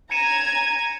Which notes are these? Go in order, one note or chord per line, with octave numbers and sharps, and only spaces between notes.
G#5 A#5 G#6 C#7 D#7 E7